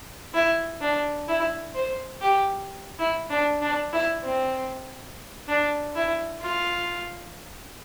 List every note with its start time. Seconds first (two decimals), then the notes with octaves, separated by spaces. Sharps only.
0.34 E4
0.81 D4
1.28 E4
1.75 C5
2.21 G4
2.99 E4
3.30 D4
3.61 D4
3.93 E4
4.23 C4
5.48 D4
5.95 E4
6.41 F4